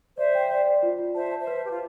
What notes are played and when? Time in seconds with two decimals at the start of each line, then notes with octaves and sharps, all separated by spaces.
0.18 C5 D5 E5
0.35 G5
0.51 D5
0.67 D5
0.83 F4
0.99 F4
1.15 C5 E5 A5
1.31 A5
1.39 C5 E5
1.47 B4
1.64 G4 B4
1.71 F4